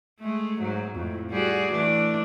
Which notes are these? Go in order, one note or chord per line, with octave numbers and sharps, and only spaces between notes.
G#3 A3
G#2 F#3
F2 A2
G3 F#4 G#4
E3 A3 D4